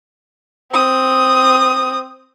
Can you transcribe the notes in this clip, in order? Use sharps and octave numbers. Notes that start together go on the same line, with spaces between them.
C4 D#6